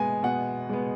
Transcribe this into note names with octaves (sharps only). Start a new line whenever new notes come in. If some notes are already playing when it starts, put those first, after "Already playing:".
Already playing: B2 G#3 B3 G#5
B2 F#5
G#3 B3